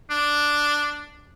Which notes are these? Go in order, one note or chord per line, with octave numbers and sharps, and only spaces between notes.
D4